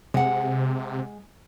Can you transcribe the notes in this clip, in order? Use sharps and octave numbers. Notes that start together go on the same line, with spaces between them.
C3 G#3 F#5